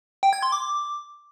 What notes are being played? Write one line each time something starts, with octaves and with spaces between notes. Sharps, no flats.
G5
G#6
C6
D6